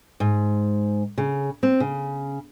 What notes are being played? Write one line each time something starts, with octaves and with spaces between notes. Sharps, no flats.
G#2
C#3
C4
C#3